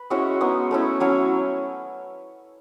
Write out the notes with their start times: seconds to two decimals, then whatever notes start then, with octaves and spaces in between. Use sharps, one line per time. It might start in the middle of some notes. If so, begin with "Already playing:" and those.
Already playing: B4
0.10 G#3 C#4 E4 F#4
0.41 G#3 B3 D#4
0.71 A3 C#4 E4
1.00 F#3 C#4 E4